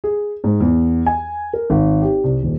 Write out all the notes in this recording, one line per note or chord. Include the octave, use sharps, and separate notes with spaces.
G#4
G#2
E2
G#5
A#4
G#1
G4
C2
D#1